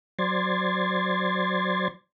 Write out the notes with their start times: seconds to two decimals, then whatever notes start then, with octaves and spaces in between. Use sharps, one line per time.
0.19 F#3 C5 D5 C6 G#6 A6